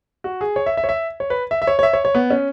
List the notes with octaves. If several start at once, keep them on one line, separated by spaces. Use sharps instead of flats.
F#4
G#4
C#5
E5
E5
C#5
E5
C#5
B4
E5
E5
C#5
C#5
E5
C#5
C#5
B3
C#4